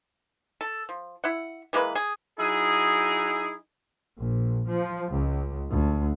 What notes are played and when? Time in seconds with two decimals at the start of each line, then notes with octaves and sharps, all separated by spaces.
0.61 A4
0.89 F3
1.24 E4 F#5
1.73 E3 G#3 A#3 B4
1.95 G#4
2.39 F#3 D#4 E4 G#4
4.19 A#1
4.68 F3
5.12 C#2
5.71 D2